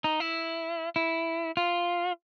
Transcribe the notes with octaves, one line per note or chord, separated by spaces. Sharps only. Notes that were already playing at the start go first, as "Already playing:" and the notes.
D#4
E4
E4
F4